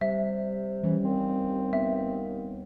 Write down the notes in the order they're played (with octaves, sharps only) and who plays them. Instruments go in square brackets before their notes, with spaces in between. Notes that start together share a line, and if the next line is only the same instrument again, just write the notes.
[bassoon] C3 [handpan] G3 [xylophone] E5
[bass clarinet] E3 [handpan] G3 C#4
[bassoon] D#2 [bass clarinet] C4
[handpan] B3 [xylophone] E5